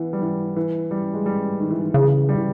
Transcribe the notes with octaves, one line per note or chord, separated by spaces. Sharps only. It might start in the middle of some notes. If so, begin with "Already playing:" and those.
Already playing: E3 B3
G3
E3
E3
G3
G#3
G3
D#3
E3
D#3
C#3 E3
G3
E3